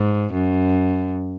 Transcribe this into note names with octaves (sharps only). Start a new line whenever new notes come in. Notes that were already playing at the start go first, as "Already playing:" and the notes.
Already playing: G#2
F#2